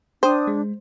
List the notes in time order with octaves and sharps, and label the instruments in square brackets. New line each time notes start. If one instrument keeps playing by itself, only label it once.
[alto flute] D4 [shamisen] C5 [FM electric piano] G5 D#6
[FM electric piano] G#3